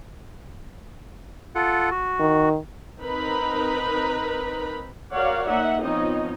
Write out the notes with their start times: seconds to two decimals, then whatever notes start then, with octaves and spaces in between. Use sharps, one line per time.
1.55 F4 A4 F#5
1.91 F#4
2.20 D#3
3.00 C4 D#4 A#4 B4 A#5 B5
5.12 F#4 A#4 C#5 D5 F5 F#5
5.47 A#3 D#4 E5 F#5
5.82 F3 B3 C4 D#4 C#5 D#5